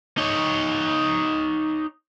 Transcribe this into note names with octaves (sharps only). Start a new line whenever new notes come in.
D#4 C#5